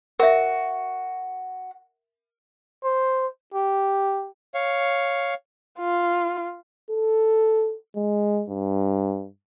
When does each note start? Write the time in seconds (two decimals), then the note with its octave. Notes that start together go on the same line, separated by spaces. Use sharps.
0.20 F#4 A#4 E5
2.84 C5
3.54 G4
4.54 C#5 F5
5.79 F4
6.90 A4
7.96 G#3
8.49 G2